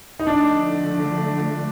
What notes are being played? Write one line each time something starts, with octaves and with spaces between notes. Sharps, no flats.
D#4
D3 F3 A3 D4